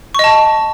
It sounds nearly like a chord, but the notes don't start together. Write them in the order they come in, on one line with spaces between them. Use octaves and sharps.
C#6 D#5 A5